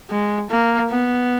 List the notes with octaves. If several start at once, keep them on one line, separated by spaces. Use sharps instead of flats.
G#3
A#3
B3